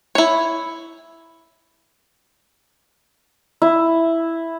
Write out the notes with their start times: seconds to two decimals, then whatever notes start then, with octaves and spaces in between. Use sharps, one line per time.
0.15 E4 C#5
3.62 E4